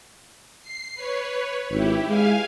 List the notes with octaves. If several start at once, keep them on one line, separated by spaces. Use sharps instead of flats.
C7
B4 C#5
G#1 E4 G4
G#3 F5 G#5